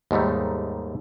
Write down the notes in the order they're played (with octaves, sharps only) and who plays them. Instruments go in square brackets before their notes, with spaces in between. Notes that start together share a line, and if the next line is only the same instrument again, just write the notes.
[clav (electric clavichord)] D#2 G#2 D#3 G3 A3